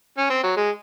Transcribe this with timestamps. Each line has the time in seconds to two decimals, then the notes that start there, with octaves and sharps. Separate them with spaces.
0.18 C#4
0.30 C4
0.43 F#3
0.57 G#3